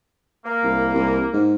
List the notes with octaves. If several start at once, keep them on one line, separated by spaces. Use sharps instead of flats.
A#3
C2
C2
G#2